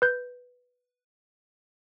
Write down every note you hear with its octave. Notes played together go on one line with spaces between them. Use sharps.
B4 G6